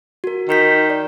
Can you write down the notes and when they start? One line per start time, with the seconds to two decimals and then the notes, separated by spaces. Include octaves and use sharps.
0.24 F#4 A#4
0.49 D#3 A#5 G6 B6
0.90 D5